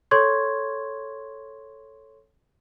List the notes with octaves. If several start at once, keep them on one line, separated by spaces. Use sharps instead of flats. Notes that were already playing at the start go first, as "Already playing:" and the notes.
A4 C#5 C6 C#6 G#6